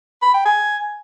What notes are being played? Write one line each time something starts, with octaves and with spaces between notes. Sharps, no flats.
B5
G5
G#5